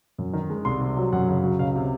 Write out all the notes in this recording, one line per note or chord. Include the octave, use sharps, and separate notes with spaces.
F#2
D#3
G#3
C2 C6
C3
F#3
F#2 F#5
C#3
F#3
C#2 F5
C3